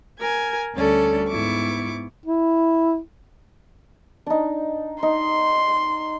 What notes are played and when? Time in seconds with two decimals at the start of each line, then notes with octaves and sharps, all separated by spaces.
0.20 A#4 G#5 G#6
0.75 D2 G3 C#4 A4 D5
1.29 G#2 B3 E4 C#6 D6
2.25 E4
4.26 D4 D#4
5.03 D#4 C6